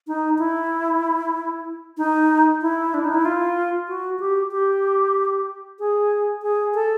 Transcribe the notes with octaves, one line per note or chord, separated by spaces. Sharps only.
D#4
E4
D#4
E4
D4
D#4
E4
F4
F#4
G4
G4
G#4
G#4
A4